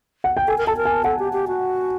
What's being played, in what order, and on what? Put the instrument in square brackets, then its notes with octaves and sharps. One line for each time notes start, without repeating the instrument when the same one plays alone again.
[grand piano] F#5
G5
[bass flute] A4 [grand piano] G#5
[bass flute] A#4
[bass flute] A4 [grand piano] A5
[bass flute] A#4
[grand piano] G#5
[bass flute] A4 [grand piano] F#5
[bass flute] G4
G4
F#4